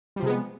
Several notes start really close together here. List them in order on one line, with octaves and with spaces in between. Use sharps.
G3 F3 C3 G#3 B3